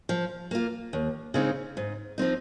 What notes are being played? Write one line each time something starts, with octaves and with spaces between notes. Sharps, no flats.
F3
A#3 F4
D#2
C#3 G#3 C4 D#4
G#2
F3 C4 D#4